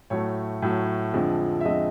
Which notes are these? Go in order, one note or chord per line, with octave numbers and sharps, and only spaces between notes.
A2 F#3 A3 C#5
A2 F#3 A3
F2 D3 F3 G#3
E5
F2 D3 F3 G#3 D#5